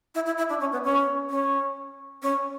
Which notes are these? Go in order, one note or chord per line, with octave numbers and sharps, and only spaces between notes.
E4
E4
E4
D4
C#4
B3
C#4
C#4
C#4